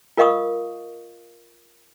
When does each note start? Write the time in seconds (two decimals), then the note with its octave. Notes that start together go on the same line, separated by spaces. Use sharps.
0.17 F4 A#4 D#5 F5 C#6 D#6